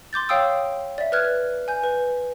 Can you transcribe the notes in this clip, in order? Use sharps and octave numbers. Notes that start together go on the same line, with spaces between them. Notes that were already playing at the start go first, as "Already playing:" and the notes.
C6 D6 G6 A6
C#5 F5 G5 D#6 E6
D5 E5
B4 D5 F6 F#6 G#6
G#5 G6
B4